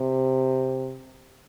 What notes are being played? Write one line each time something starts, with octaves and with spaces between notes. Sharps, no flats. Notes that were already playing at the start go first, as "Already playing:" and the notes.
Already playing: C3